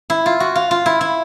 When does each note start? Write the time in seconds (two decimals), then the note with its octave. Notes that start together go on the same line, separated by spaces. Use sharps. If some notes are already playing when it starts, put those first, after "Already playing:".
0.10 E4
0.26 F4
0.40 F#4
0.55 F4
0.71 F4
0.86 E4
1.01 E4